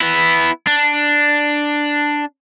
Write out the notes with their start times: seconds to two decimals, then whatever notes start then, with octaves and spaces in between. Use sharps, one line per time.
0.01 B3 E4
0.67 D4